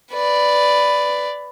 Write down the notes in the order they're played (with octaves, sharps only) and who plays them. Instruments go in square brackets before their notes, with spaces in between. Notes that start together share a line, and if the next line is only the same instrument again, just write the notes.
[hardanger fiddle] B4 D5